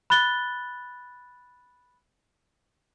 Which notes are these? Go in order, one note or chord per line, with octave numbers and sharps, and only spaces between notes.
B5 F#6 A6 G7